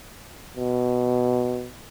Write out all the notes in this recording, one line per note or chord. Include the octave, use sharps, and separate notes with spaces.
B2